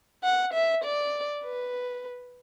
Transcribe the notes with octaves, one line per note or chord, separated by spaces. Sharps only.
F#5
E5
D5
B4